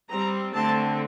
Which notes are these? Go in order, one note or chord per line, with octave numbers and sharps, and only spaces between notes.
G3 C4 A#5
D3 A3 C4 A5